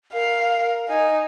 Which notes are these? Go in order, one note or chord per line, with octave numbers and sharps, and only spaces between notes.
A#4 F5
D#4 G#5